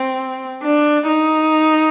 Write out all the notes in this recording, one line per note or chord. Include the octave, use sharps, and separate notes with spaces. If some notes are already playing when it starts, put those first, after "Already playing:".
Already playing: C4
D4
D#4